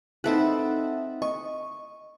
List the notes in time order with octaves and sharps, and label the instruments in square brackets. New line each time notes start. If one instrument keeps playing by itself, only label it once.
[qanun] C4 A4 B4 [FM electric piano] D#4 E5 F#5
[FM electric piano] D#5 [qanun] C#6